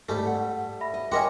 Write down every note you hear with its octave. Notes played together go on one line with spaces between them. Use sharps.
G#2 G3 A3
F#5
E5 B5 A#6
D#5
C#4 A#4 D#5 E5 F#5 G5 C6 D6